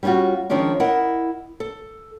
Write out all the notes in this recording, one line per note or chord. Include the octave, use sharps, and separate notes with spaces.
G3 C#4 D#4 F4 F#4
D#3 F3 G#3 C#4 D4
E4 A#4 D#5 F#5
A4